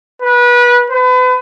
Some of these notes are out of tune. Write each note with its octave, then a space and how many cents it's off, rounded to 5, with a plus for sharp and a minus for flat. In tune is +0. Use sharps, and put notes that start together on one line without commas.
B4 -25
B4 +35